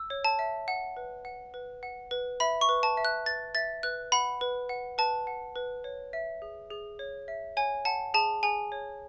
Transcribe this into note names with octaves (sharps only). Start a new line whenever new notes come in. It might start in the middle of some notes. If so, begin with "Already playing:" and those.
Already playing: E6
C#5
A5
E5
F#5
B4
F#5
B4
F#5
B4
E5 B5
C#6
B4
A5
E5
F#6
B4 A6
E5 A6
B4 F#6
F#5 B5
B4
F#5
B4 A5
F#5
B4
C#5
E5
G#4
G#4
C#5
E5
C#5 G#5
F#5 A5
G#4 A5
G#4 G#5
C#5